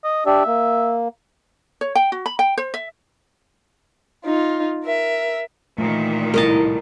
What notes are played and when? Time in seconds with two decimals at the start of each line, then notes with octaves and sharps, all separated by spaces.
0.04 D#5
0.26 D4 G4 D5 E5
0.47 A#3
1.81 C#5
1.95 G5
2.12 F#4
2.26 B5
2.39 G5
2.57 C5
2.74 E5
4.25 D#4 F4
4.85 A#4 E5
5.78 A#2 D#3 E3 A3
6.34 C2 A2 A#4 D#5 A5